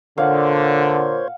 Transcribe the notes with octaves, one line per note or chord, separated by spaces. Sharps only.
A#2 D3 C5 C#5 F5 F#5